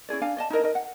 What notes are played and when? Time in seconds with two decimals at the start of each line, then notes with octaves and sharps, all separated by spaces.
0.09 C#4 E4 G#4 D5
0.22 D4 F5 G#5
0.37 D5 D#5 A5
0.50 D#4 E4 A#4 D#5
0.63 D#4 A#4 D#5
0.75 F#5